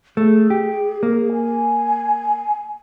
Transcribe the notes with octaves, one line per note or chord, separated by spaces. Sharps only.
A3 G#4
G4
A#3
G#5